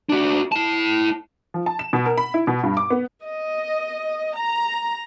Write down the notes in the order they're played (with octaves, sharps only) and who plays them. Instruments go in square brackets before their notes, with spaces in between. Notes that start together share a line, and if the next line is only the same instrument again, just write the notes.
[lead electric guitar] D4 F#4
E4 A5
[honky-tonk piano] F3
A5
E7
B2
A#4
B5
E4
B2
G2
D6
B3
[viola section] D#5
A#5